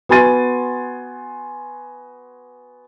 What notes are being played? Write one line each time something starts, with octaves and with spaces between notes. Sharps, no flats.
B3 F#4 G#5 C6 A6 D#7